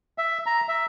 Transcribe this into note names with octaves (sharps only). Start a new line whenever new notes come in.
E5
A#5
E5